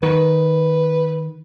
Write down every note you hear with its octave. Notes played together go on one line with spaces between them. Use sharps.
D#3 B4